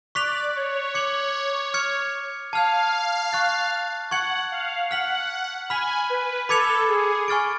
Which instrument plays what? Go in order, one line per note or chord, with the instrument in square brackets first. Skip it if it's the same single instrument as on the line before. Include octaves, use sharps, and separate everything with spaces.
[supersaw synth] D5 [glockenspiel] C#6 F#6 B6 F7
[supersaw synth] C#5
[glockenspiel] D6 G#6 C#7 F#7
F6 G#6 C#7
[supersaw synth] F5 [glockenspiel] A5 F6 G#6
[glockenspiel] C#6 F#6 A6
[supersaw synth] F#5 [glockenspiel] C#6 G#6 C#7 F#7
[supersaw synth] F5
[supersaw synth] F#5 [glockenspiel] F6 B6 F#7
[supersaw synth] G#5 [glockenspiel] B5 F6 B6 F#7
[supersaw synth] B4
[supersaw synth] A4 [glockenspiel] B5 D6 G#6 C#7 F7
[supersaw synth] G#4
[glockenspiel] G#5 C#6 F6 A6 D7